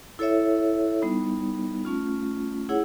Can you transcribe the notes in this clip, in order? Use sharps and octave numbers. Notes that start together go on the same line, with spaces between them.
E4 A4 C#5 E5
G3 B3 D#4
A3 C#4 F4
E4 G#4 C#5 F#5